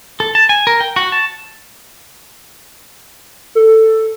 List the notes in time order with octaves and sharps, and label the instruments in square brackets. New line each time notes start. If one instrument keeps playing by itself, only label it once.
[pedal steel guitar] A4
A5
G#5
A#4
G5
F#4
A5
[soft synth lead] A4